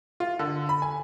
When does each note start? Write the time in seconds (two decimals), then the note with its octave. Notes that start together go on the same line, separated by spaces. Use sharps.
0.20 F4
0.39 D3
0.69 B5
0.82 G#5